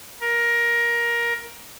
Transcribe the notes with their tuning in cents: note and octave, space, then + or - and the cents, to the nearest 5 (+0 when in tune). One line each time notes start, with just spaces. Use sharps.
A#4 +15